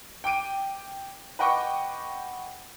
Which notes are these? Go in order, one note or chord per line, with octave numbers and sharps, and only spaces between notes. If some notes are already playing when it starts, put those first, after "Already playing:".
G5 D6 D7 D#7
B4 D#5 F#5 G5 C#6 D6